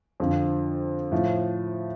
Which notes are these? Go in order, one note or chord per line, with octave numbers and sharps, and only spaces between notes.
F2 D3 F3
A2 F3